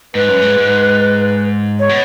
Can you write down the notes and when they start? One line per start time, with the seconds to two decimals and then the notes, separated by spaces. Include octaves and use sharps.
0.14 G#2 B4
0.28 F#2
0.42 G#2
0.58 G#2
1.79 C#5
1.89 B2